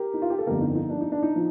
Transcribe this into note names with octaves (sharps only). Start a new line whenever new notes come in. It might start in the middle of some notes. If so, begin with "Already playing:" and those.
Already playing: G4 A#4
D#4
F4
G4
A4
G1 F2 D3 G4 A#4
D#4
D#4
D4
D#4
D4
D#4
F3